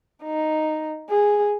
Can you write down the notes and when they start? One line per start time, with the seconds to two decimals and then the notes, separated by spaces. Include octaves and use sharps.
0.24 D#4
1.10 G#4